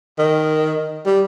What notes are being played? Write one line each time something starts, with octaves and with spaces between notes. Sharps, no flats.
D#3
G3